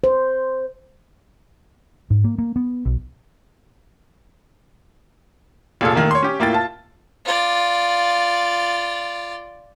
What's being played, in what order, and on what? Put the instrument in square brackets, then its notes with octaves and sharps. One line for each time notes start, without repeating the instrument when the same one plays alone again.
[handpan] C5
[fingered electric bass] G#2
A#3
A#3
B3
B1
[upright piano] F1 A#2 F4 G#4 A4
D#3 A3 A#3
C#5 C6
C#4 G4
A2 A#3 F4 G5 A6
F4 A5
[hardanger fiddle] F4 D5